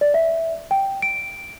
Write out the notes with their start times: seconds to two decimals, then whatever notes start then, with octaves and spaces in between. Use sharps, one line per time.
0.01 D5
0.14 E5
0.71 G5
1.02 D7